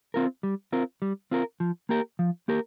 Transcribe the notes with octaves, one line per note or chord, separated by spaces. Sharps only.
C4 F4 A#4
G3
C4 F4 A#4
G3
C4 F4 A#4
F3
A#3 G4 A#4
F3
A#3 G4 A#4